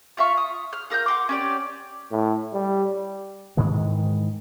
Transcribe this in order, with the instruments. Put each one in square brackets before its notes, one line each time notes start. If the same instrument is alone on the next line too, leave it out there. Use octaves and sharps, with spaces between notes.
[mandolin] F4 E5 F5 C#6
D#6
F6
F4 A#4 E6 G6
F#5 C6 D6
C#4 G4 D5
[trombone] A2
G3
[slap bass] G#2 D#3 E3 G#3